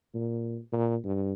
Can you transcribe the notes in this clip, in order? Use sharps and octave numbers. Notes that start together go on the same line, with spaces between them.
A#2
A#2
G2